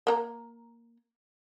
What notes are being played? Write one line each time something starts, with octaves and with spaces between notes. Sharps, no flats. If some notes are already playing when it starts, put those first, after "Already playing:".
A#3 A#4 A#5